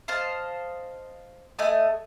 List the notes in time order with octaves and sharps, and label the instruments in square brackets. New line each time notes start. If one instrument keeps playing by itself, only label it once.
[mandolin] C5 D#5 F5 A5
A3 D#5 G#5 D#6